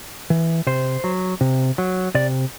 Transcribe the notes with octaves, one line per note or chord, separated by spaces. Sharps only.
E3
C3 C5
F#3
C3
F#3
C3 D5